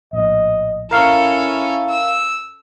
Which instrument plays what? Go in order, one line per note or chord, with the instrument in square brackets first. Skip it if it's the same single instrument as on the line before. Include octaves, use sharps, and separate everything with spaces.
[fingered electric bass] A#1 A2 [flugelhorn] D#5
[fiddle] C#4 A4 [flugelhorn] E4 [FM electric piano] A#4 F5 C#6
[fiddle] E6